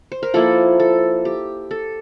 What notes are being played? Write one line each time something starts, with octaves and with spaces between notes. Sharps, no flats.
C5
A#4
F3 A#3 E4 A4
A4
G4
A4